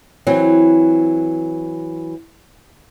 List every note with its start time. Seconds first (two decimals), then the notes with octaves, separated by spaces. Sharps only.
0.27 E3 F#3 C4